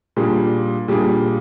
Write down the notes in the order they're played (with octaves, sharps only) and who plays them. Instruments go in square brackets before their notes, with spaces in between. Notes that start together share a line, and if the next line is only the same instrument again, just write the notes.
[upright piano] A#2 G3 D4 G#4
A#2 G3 D4 G#4